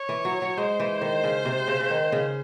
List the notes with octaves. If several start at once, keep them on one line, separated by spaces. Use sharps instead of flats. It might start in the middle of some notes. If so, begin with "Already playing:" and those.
Already playing: C#5
E3
F#3
F#3
G#3 C5
E3
D#3
C#3
C3
C#3
C#3
D#3
C#3